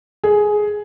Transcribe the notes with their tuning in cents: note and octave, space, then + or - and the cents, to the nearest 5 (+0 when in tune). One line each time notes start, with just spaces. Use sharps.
G#4 +10